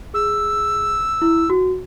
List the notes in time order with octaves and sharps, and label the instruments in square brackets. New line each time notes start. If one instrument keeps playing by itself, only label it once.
[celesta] G#4 [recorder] E6
[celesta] E4
F#4